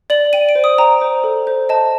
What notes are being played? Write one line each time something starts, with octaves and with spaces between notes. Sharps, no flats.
D5 F#7
G5 D#7
D7
C5
D#6
G5 A#5
C5
A4
C5
D#5 A5